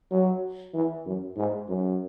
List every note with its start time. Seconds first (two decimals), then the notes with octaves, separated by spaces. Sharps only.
0.11 F#3
0.74 E3
1.06 F#2
1.37 G#2
1.69 F#2